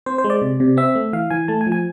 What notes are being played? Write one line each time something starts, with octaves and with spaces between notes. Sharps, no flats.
C4 C5
C5
G#3
D5
C3
C3
C4 E5
A3
E3 F5
E3 G#5
A3 A5
G#5
F3
G#5